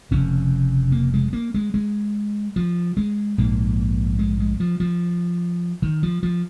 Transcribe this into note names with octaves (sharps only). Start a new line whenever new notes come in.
F1 F2 C#3 C#4
A#3
G#3
A#3
G#3
G#3
F3
G#3
A#1 G#2 A#3
G#3
G#3
F3
F3
D#3
F3
F3